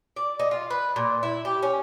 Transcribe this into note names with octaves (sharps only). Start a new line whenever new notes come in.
D5
D#4
F4
B4
A#2
E4
G4
C#4